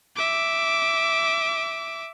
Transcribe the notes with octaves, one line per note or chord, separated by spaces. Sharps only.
E5 D6